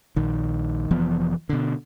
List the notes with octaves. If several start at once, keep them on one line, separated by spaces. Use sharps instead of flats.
A#1 D#3
F1 E3 F3 B3
B2 D3